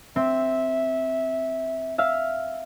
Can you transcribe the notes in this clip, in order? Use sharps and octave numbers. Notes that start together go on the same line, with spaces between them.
C4 E5
E5 F5